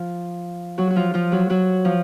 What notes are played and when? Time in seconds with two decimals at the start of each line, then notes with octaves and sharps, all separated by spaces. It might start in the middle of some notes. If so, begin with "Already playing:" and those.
Already playing: F3 F4
0.78 F#3 F#4
0.90 F#4
0.96 F3 F4
1.14 F3 F4
1.32 F#3 F#4
1.50 F#3 F#4
1.85 F3 F4